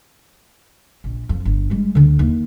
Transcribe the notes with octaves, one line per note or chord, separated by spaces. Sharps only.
A#1
F2
G1
G3 G#3
D2 D3
D#2